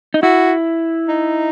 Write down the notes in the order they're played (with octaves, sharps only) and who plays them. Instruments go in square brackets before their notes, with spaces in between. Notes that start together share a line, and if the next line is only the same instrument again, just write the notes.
[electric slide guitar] D#4
[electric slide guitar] E4 [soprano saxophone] F#4
[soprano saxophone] D#4